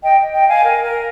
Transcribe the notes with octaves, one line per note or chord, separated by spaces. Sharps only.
D#5 G5
D#5 G5
F5 G#5
A#4
A#4